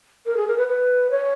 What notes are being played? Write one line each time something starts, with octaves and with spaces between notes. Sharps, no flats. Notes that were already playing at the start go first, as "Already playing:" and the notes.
A#4
G#4
A#4
B4
B4
C#5